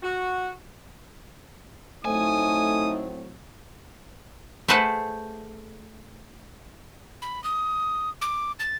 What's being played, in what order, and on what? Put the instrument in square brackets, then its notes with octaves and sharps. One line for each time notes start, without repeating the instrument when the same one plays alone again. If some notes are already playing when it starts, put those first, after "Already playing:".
[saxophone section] F#4
[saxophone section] A2 F#3 C4 [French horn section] A3 D#4 [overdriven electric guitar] G#5 [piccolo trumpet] D#6
[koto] A3 G#4 A4 B4 C5 F#5
[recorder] B5
D#6
D6
A6